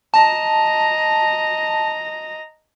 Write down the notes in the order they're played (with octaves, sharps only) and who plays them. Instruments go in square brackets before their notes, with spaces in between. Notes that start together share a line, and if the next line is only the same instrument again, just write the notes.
[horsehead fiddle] D#5 A#5 [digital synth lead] A5